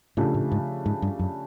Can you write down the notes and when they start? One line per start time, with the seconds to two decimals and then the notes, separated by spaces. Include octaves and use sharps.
0.17 A2 C#3 F3 A3 D4 G4
0.34 A2
0.52 G#2
0.86 G#2
1.02 G2
1.19 F#2